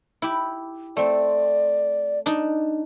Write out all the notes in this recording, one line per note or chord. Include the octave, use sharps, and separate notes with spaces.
E4 G4
A3 C4 D5
D4 D#4